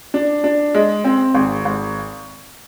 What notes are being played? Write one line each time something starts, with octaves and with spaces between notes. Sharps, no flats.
D4
D4
G#3
C4
G#1
G#1